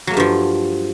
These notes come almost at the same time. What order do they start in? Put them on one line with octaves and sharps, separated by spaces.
F#3 A#3 A3 G2 F3